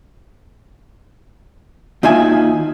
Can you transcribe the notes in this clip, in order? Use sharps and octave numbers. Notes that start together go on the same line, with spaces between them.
D#2 D#4 F4 E5 G#5